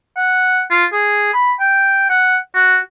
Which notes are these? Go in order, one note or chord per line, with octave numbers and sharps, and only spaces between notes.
F#5
F4
G#4
B5
G5
F#5
F#4